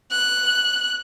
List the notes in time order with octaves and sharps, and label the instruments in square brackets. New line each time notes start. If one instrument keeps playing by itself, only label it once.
[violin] F#6